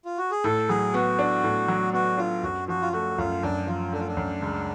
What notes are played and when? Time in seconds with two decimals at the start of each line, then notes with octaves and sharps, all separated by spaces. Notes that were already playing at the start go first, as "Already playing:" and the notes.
0.05 F4
0.18 F#4
0.31 G#4
0.44 A2 A4
0.69 F#3 G#4
0.94 B3 F#4
1.19 D4
1.43 A2
1.68 F#3
1.93 B3 F#4
2.18 D4 F4
2.43 F#2 F#4
2.68 F3 F#4
2.82 F4
2.93 A3 F#4
3.18 F#2 F4
3.42 F#2 D4
3.67 F3 F4
3.92 A3 D4
4.00 F4
4.07 D4
4.17 F#2
4.42 C#2